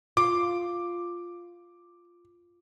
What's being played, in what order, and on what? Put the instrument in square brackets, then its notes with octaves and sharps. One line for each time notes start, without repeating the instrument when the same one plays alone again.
[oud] F4 [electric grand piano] D6